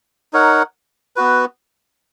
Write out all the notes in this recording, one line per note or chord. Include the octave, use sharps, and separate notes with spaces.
D#4 A#4 C#5 F#5
B3 F#4 B4